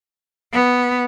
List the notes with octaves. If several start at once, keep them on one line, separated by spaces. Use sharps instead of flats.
B3